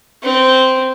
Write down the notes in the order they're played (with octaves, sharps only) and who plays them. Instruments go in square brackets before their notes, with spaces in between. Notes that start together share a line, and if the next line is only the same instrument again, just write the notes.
[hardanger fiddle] C4